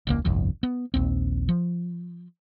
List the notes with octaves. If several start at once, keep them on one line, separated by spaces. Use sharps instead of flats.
E1 C#2 A#3
G1 C2 F2
B3
A#1 D#2 C4
F3